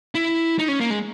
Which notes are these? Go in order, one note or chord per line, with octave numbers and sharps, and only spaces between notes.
E4
D#4
C#4
A#3
G#3